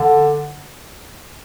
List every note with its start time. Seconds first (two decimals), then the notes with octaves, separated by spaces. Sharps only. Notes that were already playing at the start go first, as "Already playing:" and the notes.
Already playing: D3